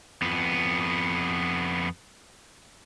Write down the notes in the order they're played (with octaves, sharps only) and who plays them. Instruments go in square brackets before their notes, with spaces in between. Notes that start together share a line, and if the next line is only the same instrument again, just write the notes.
[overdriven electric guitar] F2 B3